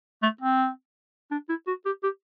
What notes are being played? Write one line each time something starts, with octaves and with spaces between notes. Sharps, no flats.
A3
C4
D4
E4
F#4
G4
G4